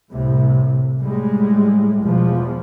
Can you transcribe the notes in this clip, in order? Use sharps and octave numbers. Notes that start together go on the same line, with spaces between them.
C2 A2 C3
A2 G3 G#3
E2 B2 F3